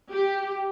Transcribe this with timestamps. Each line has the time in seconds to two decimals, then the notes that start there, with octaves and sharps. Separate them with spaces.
0.10 G4